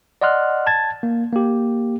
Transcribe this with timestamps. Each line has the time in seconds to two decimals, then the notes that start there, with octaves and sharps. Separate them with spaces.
0.21 D5 D#5 F#5 C6 F6 F#6
0.67 A5 G#6 A6
1.03 A#3
1.33 A#3 G4